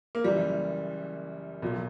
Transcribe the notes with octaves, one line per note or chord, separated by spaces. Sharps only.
A#3
F#1 F#2 E3 G3
B1 A#2 F#3